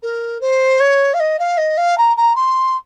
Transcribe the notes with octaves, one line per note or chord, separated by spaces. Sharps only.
A#4
C5
C#5
F5
D#5
F5
D#5
F5
A#5
A#5
C6